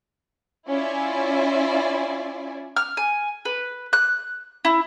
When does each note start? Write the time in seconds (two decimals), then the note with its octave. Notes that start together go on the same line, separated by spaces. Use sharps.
0.68 C#4 E4 F4 D5 E5 G#5
2.76 F6
2.97 G#5
3.45 B4
3.93 F#6
4.65 E4